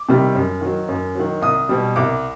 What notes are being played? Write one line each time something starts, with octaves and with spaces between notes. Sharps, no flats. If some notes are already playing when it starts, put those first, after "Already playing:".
Already playing: D6
C3 D#3 G3
F#2
D#3 F#3
F#2
D#3 F#3
C2 D#6
B2 G3
C2 D6